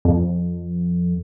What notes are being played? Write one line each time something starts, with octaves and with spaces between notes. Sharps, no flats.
F2